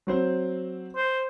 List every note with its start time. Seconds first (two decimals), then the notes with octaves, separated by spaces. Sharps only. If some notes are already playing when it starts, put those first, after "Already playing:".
0.07 F#3 C4 C5
0.96 C5